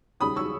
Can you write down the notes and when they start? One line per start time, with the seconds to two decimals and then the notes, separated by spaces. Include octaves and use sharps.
0.20 D#2 C#3 G3 B5 D#6
0.36 C#6 E6